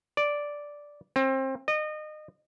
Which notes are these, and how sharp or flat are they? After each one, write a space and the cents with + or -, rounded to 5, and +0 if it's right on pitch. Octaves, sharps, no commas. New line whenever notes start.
D5 -5
C4 +25
D#5 -30